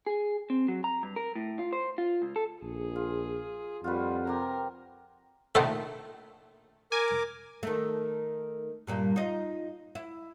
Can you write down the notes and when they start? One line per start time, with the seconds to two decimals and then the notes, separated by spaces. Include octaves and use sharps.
0.07 G#4
0.50 C4
0.68 F#3
0.84 A#5
1.03 G2
1.16 A#4
1.36 A2
1.59 F4
1.73 C5
1.98 F4
2.22 C#2
2.36 A4
2.63 A#1 G#4
2.96 F4
3.84 F2 G3 F4 F#4 B4
4.27 C3 G4 A#4
5.55 A#1 D#3 A3 A4 C5 F#5
6.92 A#4 G#5 D6
7.63 D#3 A3
8.87 G2 A#2 G3
9.16 D#4 F4 D#5
9.95 E4